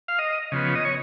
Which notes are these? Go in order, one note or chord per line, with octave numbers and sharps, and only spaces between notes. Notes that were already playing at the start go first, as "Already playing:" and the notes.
F5
D#5
C#3 F3 B3
D#5
C#5